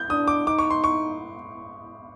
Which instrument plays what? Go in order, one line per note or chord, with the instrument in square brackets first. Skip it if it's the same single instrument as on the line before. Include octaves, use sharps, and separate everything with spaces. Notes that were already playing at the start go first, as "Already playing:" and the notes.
Already playing: [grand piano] G6
[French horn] D4 [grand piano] D#6
[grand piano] D6
[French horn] D#4 [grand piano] D6
[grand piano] C#6
C6
C#6